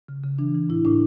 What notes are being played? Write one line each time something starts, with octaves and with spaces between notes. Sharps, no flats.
C#3
C#3
E3 D4
E3
A2 E4
A2 D4